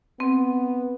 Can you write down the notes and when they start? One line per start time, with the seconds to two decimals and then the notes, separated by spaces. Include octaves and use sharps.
0.20 B3 C4